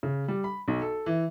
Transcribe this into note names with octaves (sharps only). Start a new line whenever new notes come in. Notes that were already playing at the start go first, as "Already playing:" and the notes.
C#3
G3
B5
B1
A4
E3